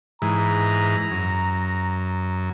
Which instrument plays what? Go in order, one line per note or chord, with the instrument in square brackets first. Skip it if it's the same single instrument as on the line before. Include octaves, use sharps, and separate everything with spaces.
[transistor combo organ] G#2 E3 [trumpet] A#5
[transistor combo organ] F#2